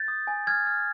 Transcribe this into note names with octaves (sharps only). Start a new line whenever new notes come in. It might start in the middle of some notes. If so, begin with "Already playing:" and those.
Already playing: G6 A6
D#6
G#5
F6 G#6
F6